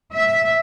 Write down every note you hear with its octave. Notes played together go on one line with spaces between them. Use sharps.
E5